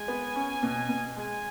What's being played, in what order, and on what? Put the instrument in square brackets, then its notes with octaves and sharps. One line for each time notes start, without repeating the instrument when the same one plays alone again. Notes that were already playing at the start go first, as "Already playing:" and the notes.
Already playing: [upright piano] G#3 [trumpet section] G#5
[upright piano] B3
C#4
B2
B2
[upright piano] G#3 [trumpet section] G#5